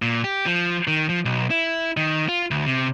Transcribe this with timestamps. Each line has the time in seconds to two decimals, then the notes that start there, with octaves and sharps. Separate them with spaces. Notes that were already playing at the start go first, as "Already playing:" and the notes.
0.02 A#2
0.24 G4
0.46 F3
0.87 D#3
1.09 F3
1.25 B1
1.50 E4
1.97 D#3
2.29 F4
2.51 D2
2.66 C3